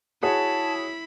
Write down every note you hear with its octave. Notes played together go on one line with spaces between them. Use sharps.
E4 F#4 G#4 C#5 A5 B5